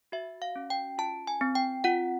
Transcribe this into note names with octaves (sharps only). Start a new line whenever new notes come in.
F#4 E5
F5
C#4
G5
F4 A5
G#5
C4
G5
F4 F#5